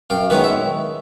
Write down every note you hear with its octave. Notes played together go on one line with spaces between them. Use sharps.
F#2 F5 G5
D#3 G#3 B3 D#4 B4 C#5
E5